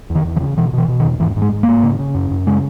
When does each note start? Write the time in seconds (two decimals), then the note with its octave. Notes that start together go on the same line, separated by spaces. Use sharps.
0.10 E2
0.15 D#3
0.25 E2
0.36 E3
0.41 C#3
0.57 B2 E3
0.73 B2
0.78 E3
0.88 B2
1.00 D#3
1.05 E2
1.20 G#2 E3
1.36 G#2
1.42 G#3
1.52 G#2
1.63 A#3
1.68 G#2
1.83 C#3
1.99 C#3
2.15 F#2
2.31 F#2
2.47 C#3 G#3